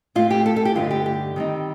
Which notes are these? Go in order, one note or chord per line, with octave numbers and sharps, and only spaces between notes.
A2 A3 C4 F4
G4
A4
A4
G4
G2 D3 A3 D#4 F4
G4
G4
D#3 G3 C4 D#4